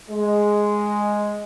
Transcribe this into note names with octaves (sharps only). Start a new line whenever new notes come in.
G#3